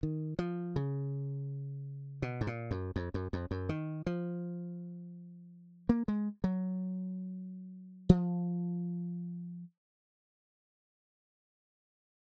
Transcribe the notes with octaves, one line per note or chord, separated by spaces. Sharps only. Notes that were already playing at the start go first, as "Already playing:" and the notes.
D#3
F3
C#3
B2
G#2
A#2
F#2
F2
F#2
F2
F#2
D#3
F3
A#3
G#3
F#3
F3